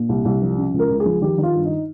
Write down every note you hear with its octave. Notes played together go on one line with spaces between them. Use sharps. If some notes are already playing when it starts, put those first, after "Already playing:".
Already playing: A#2
C2
C2
F3
C#3
C#2
A#4
C#2
G#4
F3
D#3 G4
D#3
F4
G2
D#4